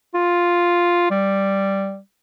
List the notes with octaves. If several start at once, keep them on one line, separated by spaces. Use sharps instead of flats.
F4
G3